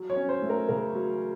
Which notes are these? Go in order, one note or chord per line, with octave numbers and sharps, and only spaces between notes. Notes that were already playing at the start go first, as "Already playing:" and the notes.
Already playing: F#3
C#5
C#4
C5
A3
A#4
C#3 A#4
F#3